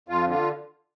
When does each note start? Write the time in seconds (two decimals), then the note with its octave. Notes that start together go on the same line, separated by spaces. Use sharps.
0.08 F2 F4
0.26 D3 F4